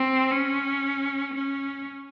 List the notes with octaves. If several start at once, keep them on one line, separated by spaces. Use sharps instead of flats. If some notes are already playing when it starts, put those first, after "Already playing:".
Already playing: C4
C#4
C#4